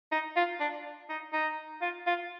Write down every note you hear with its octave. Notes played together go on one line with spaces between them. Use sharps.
D#4
F4
D4
D#4
D#4
F4
F4